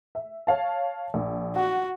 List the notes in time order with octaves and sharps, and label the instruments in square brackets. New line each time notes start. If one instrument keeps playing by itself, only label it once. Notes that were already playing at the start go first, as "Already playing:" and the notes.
[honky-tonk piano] E5
C#5 F5 A5
A#1
[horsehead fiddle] F#4 [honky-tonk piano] F#5